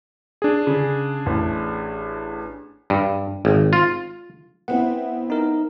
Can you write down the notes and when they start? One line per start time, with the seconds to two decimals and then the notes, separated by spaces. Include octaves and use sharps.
0.42 D4 G#4
0.67 C#3
1.26 A1
2.90 G2
3.45 G#1
3.73 F4
4.68 B3 C4 E4 F#5
5.30 D#4 A#4